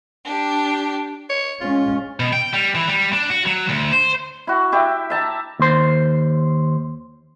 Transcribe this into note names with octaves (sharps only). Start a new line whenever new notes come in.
D4 G4
C#5
G#3 C#4 F4
B2
G5
G3
E3
G3
D4
F#4
F#3
D2
C5
E4 F#4
E4 G4 E5
E5 A5 A#5
D#2 C5